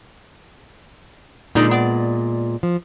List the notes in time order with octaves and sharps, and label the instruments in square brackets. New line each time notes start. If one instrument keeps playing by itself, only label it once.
[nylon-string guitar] A#2 G#3 [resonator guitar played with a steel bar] D3 D#4 D5
[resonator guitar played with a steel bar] B3 D5
[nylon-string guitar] F3